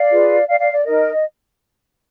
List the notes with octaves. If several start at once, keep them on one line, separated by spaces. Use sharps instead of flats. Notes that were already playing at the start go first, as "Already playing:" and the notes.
Already playing: D5 F5
F4 G#4 B4
D5 F5
D5 F5
D5
D#4 A#4 D#5